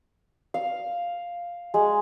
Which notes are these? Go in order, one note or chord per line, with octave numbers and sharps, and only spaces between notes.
F5
G#3